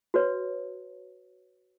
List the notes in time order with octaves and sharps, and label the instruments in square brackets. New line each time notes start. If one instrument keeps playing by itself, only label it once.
[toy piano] F#4 B4 C#5